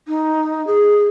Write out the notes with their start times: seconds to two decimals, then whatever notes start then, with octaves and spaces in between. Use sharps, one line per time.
0.07 D#4
0.67 G#4